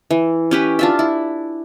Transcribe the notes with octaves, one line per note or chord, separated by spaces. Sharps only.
E3
C#4 G4 B4
D4 F4 E5
E4